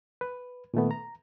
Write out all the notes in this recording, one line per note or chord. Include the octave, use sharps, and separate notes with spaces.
B4
A#2 D#3 A3 B3
A#5